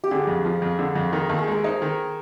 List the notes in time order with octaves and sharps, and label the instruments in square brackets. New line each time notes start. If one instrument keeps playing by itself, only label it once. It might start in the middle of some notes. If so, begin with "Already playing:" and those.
[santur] G4
[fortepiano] D3 [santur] G#4
[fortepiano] F2
F3
F2
D3
F2
D#3
D#2
[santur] G#4
[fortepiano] G#3 [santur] A#4
[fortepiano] D#4 [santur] C5
[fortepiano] D#3